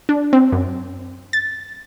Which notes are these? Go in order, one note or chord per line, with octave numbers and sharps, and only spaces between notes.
D4
C4
F#2
A6